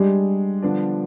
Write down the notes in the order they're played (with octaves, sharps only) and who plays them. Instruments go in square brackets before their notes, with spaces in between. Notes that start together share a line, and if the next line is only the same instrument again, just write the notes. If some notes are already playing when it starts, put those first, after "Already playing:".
Already playing: [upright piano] G3 [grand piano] G#3 D4 G#4
[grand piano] D3 F3 B3 D4